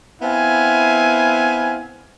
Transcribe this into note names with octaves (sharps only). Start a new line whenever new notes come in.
B3 C4 E4 F5 G#5